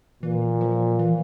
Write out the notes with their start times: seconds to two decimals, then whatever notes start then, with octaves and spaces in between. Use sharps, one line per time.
0.23 A#2 E3
0.61 F3
0.99 E3